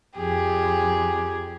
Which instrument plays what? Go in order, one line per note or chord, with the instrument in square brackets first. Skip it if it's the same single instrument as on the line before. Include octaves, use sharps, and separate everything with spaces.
[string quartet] F2 [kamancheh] G4 G#4